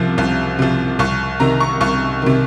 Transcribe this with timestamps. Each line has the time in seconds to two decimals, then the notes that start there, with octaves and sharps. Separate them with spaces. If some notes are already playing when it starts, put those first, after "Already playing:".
Already playing: C2 C3 F3
0.18 C2
0.59 C3 F3
0.99 C2 C#6
1.40 C3 D#3 A#5
1.60 C#6
1.81 C2 C#6
2.22 C3 D#3